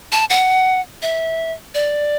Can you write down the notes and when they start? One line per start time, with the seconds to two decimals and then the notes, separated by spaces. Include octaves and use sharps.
0.12 A5
0.30 F#5
1.02 E5
1.75 D5